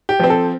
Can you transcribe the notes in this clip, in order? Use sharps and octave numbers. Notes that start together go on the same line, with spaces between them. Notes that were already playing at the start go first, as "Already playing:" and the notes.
G4
F3 C4
A4